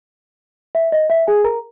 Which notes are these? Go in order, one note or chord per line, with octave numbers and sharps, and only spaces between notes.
E5
D#5
E5
G#4 G#5
A#4 A#5